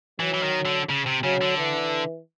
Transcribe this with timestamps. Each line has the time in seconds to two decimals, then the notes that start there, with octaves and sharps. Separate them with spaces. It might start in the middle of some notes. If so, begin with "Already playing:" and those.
0.20 E3 F#3
0.34 E3
0.43 D#3
0.65 D3
0.89 C#3
1.06 C3
1.23 C#3 F#3
1.41 D3
1.58 E3